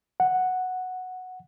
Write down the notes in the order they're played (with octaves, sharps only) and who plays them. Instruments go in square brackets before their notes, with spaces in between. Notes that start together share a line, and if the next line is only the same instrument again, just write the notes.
[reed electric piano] F#5